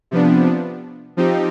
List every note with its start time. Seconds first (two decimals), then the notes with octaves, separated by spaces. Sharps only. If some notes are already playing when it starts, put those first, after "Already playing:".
0.11 C3 F3 B3 D4
1.17 F3 C4 D#4 G4